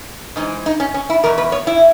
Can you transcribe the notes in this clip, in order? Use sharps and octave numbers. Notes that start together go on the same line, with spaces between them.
G#2 E3 D#4
D#4
C#4
C#4
E4
E2 B2 A#4
B4
C#5
E4